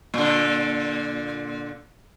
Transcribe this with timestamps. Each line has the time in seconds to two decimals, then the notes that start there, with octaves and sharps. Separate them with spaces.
0.14 A#2 D3